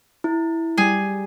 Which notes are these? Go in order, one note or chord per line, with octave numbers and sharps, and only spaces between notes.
E4
G3 G#4 G#5